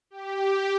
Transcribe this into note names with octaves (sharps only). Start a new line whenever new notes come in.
G4